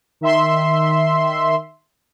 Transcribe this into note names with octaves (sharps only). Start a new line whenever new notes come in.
D#3 E5 C6